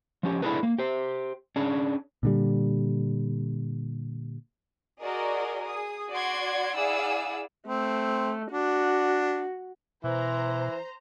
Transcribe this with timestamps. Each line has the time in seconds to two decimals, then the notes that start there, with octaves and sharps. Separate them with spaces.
0.23 F3 C#4 G4
0.42 D4 E4 F4 G#4 A4 B4
0.63 A#3
0.78 G4 C5
1.56 C#4 D4 G#4
2.23 A#2 D3 G3
5.00 F#4 G#4 A#4 D5 D#5
5.64 G#4 D#6
6.11 F#4 D5 F#5 C6 G#6 D7
6.75 E4 G#4 D5 F5 F#5 E6
7.68 A3 C4
8.52 D4 F#4
10.04 B2 E3 C5 A#5